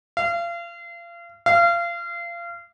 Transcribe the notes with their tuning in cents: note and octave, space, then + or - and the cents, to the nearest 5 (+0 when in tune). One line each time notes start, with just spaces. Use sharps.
F5 -35
F5 -30